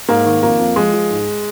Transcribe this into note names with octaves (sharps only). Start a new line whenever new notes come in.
G#2 A#3
D#3
F2 A#3
F2
F3 G#3
F3
G#2